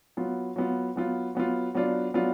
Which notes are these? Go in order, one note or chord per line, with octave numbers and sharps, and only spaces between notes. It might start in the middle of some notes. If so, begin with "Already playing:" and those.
F#3 B3 F4
F#3 B3 F4
F#3 B3 F4
F#3 B3 F4
F#3 B3 D4 F4
F#3 B3 D4 F4